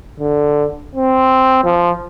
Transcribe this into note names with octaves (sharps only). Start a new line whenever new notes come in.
D3
C4
F3